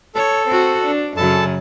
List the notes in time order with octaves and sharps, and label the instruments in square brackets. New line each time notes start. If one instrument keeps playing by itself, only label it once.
[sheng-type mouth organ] A4 [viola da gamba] C#5
[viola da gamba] C4 F#4
D4
[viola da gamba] F#2 C#3 F#3 [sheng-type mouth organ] A4 A5